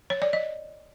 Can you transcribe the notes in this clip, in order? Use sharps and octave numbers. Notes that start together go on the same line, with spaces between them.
C#5
D5
D#5